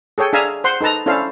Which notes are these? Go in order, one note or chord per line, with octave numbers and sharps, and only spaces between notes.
G#4 A4 C#5 G5
D4 G#4 E5 F5 G#5 A#5
C5 F#5 C6
D#4 A4 B4 A5 A#5
C#4 D4 E4 A4 C5 F5